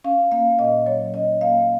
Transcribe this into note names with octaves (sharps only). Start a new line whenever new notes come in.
C#4 F5
A#3 F5
A#2 D#5
F#3 C#5
C#4 D#5
A#3 F5